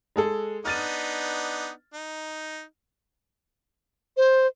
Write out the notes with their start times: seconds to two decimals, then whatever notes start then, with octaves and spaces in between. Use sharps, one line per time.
0.16 G#3 G#4 A4
0.65 B3 D4 D#4 F6 A6 D#7
1.94 D#4
4.17 C5